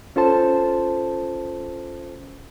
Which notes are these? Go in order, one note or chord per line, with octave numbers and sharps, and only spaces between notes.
C#4 F4 A4 C5 A5